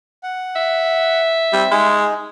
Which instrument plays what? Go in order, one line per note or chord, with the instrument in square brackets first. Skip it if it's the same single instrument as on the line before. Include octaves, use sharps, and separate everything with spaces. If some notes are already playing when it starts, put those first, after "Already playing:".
[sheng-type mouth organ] F#5
[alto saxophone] E5
[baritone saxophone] G3 [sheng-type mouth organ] C4
[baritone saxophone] G#3 [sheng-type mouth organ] D#4 G#4